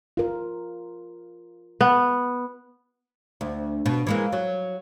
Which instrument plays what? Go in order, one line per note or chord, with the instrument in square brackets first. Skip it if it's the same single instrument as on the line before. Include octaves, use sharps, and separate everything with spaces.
[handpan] F4 A#4
[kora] B3
[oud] D2
B2
E3 G#3 A#3
F#3